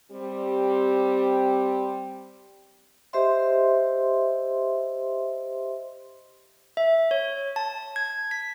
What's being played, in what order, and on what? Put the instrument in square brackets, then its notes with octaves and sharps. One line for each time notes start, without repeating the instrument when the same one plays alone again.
[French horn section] G3 C4 G4
[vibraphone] G4 C5 D#5 E5 C6
[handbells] E5
C#5
A5
G#6
B6